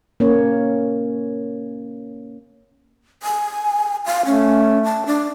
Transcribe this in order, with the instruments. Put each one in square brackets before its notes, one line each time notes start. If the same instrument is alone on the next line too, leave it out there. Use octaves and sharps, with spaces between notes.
[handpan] A#3 C#4 C#5
[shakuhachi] G#5
F5
[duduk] A3 [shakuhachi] C#4
[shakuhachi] A5
D4